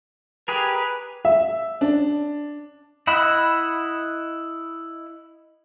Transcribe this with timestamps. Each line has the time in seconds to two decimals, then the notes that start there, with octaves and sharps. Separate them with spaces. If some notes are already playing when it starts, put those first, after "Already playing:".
0.48 G4 G#4 A#4 B4
1.25 E5
1.81 D4
3.07 E4 D#5 E5 F#5 B5